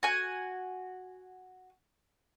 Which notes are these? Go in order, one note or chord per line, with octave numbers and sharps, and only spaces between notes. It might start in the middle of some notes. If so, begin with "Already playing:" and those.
F#4 G#5